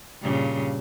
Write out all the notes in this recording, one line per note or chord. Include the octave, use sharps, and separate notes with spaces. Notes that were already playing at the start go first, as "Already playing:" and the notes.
G2 A#2 C#3